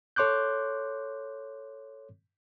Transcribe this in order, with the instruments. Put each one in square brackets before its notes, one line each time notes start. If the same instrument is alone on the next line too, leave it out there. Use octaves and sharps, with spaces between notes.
[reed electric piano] A4 C#5 C6 D6 F#6 G6